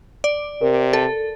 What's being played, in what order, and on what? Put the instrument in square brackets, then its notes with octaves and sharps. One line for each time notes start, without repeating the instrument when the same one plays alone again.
[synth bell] D5
[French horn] C3 [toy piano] A#4
[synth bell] A4